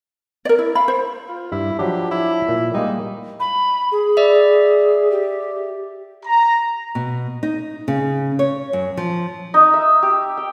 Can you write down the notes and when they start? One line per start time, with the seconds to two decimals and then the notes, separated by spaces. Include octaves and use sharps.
0.45 A#4 D5
0.59 E4
0.75 F5 B5
0.88 C5
1.28 F4
1.52 G2 E4
1.79 F3 F#3 D4 G4
2.11 E4
2.48 A#2
2.74 G3 G#3 A#3 D#4
3.40 B5
3.92 G#4
4.17 D5 E5
5.11 G4
6.26 A#5
6.95 B2
7.43 D#4
7.88 C#3
8.39 C#5
8.73 F#2
8.97 F3
9.54 D#4
9.74 E5
10.03 G4
10.37 G5